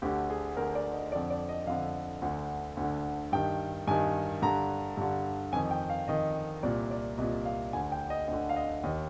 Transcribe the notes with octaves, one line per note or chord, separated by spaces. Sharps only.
D2 D3 G4
G#4
D2 D3 A#4
D5
D#5
F2 D3 D5
D5
D#5
F2 D3 F5
D2 D3
D2 D3
G2 D#3 G5
G2 D#3 G#5
G2 D3 A#5
G2 D3
F2 D#3 G#5
G5
F5
F2 D#3 D#5
C2 A#2 D5
D5
C2 A#2 D#5
F5
D2 D3 G#5
G5
D#5
D2 D3 D#5
F5
D#5
D#2 D#3 D#5